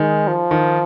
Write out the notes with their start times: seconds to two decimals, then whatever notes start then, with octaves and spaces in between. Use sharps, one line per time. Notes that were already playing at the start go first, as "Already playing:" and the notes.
Already playing: D#3 G#3
0.27 F3
0.51 D#3